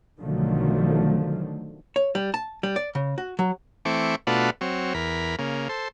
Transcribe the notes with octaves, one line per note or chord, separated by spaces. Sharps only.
B1 D3 D#3 F3 F#3 A3
C#5
G3
A5
G3
D5
C#3
F#4
F#3
E3 A3 C4 C#6 D6
B2 A3 D4 F4 F#4 B4
F#3 C4 C#5
E2 A#4 B5
C#3 A#3
A4 C5